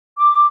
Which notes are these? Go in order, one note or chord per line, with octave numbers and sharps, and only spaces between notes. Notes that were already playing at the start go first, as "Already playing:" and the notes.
D6